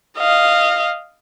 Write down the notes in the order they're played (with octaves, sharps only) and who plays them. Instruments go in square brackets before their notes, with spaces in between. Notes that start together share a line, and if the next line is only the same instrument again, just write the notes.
[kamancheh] D#5 F5